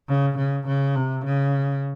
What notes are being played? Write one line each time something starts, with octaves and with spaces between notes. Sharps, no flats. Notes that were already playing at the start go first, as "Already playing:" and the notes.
C#3
C#3
C#3
C3
C#3